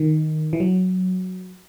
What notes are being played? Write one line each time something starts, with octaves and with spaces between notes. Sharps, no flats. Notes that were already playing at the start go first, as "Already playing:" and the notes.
Already playing: D#3
E3
F#3